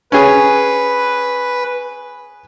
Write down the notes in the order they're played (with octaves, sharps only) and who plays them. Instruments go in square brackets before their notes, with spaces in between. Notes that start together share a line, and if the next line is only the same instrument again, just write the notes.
[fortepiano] C#4 G#4 [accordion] B4